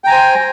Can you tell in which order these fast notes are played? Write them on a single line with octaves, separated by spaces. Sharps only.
G5 A#5 G#5 C5